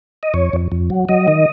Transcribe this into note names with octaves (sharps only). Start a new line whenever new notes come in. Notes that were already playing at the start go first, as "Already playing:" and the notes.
D#5
F2 C#5
F2
F2
F#3
F#3 D#5
D#3